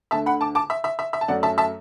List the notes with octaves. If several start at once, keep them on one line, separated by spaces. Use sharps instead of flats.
D2 D3 A3 E5 A5
F#5 B5
A5 D6
A5 D6
E5
E5
E5
E5
A5
F#2 F#3 A3 D5 F#5
E5 A5
E5 A5